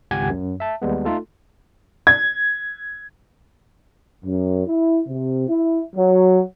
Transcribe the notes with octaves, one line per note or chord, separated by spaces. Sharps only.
G#1 C#2 G4 F#5 G#5 G#6
F#2 F#3
E5 A5
D#2 G3 G#3 B3
A3 D#4 F4 A4
G#6
F#2
E4
C3
E4
F#3